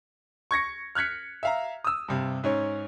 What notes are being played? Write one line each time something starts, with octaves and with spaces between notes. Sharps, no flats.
C#6 G#6 A#6 C#7
F6 F#6 G#6 B6 C#7
E5 F5 A#5
D#6 E6
G2 C3
G#2 C#4 C#5